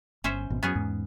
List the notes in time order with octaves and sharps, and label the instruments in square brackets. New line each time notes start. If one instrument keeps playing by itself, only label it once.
[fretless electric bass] G1 [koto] C#4 C5 E5
[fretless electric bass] G#1 B2
[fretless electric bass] F#2 F#3 [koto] B3 C#4 G#4
[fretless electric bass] E2 G#2